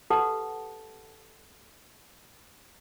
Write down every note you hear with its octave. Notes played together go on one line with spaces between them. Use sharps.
G4 A4 B4 F#5 A5